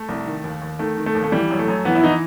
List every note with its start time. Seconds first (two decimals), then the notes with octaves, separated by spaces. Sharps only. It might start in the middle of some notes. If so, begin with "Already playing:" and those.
Already playing: A3
0.09 C2
0.26 D#3
0.44 D#2
0.62 D#2
0.79 D#3 A3
0.97 D#3
1.06 A3
1.15 D#2
1.24 A3
1.32 E3 G3
1.50 F#2
1.59 A3
1.68 F#2
1.85 E3 B3
1.95 E4
2.03 E3 D#4